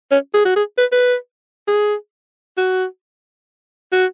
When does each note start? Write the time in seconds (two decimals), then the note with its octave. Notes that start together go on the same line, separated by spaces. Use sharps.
0.11 C#4
0.34 G#4
0.45 F#4
0.56 G#4
0.78 B4
0.92 B4
1.68 G#4
2.58 F#4
3.92 F#4